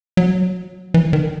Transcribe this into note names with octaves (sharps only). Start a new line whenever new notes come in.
F#3
E3
D#3